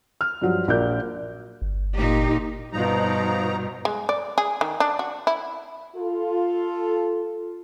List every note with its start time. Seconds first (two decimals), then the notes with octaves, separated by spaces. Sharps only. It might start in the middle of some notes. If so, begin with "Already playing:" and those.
0.21 F6
0.41 G2 F3 F#3
0.68 A#1 A#4 D5 G6
1.62 G1
1.94 A#2 D#4 G4
2.72 G2 B2 F3 D#4 A#5
3.85 G#3
4.09 D5
4.38 G#4
4.61 D#3
4.80 D4
4.99 F#4
5.27 E4
5.96 F4 A4